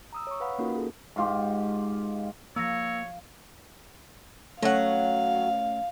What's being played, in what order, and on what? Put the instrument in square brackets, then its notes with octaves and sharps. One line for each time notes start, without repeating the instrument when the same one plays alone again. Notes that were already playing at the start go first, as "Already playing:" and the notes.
[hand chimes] A#5 D#6 E6
C#5 C#6
B4 F5 F#5 B5
A#3 C#4 D#4 F4 F#4 A#4
G#4 A4
[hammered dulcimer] G#2 F4 G4
[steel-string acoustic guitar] F3 F5 [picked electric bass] A#3 [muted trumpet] C#5 [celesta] E6 A#6
[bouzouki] F#3 F#5 [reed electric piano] A3 C#4 C#5 [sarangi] F5